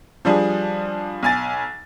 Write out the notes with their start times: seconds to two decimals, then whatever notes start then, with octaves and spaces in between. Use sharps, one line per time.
0.25 F3 G3 D4 G#4
1.23 B1 G#5 A6